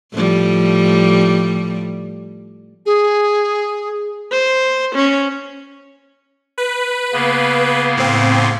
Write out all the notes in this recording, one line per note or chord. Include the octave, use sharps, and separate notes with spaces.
A2 F3 G3
G#4
C5
C#4
B4
C#3 A#3 B3
A2 C4